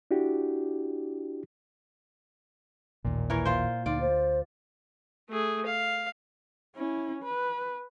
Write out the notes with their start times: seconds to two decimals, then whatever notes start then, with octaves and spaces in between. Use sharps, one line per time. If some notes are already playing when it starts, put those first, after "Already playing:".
0.11 D4 E4 F#4 G4
3.05 A1 D#2 A#2
3.30 E3 A#4 C#5
3.45 F4 C5
3.86 D2 D#4 F4 D5
4.00 C5
5.30 A3 G#4
5.66 F5
6.76 C#4 E4
7.24 B4